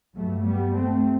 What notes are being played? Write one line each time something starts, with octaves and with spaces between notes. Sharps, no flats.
G2 F#3 A3
G3 B3
A3 C4